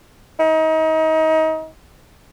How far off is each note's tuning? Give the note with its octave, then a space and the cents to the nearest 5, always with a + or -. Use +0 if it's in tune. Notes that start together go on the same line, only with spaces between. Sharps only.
D#4 +30